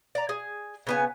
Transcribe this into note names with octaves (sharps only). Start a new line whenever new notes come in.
D5 A#5
G#4
C#3 B3 G#5